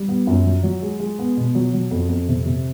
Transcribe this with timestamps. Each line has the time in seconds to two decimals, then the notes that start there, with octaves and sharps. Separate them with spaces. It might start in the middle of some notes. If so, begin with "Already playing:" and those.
Already playing: G3
0.08 B3
0.27 F#2
0.46 F#3
0.63 F#3
0.82 G#3
1.00 G#3
1.19 B3
1.37 B2
1.55 F#3
1.73 F#3
1.91 F2
2.09 F2
2.28 C3
2.46 C3